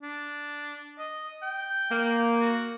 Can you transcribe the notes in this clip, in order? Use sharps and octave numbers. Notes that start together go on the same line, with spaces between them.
D4
D#5
G5
A#3
F#4